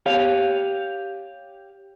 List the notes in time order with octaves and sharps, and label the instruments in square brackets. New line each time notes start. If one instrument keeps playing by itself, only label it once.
[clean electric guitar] G4 C#5 F5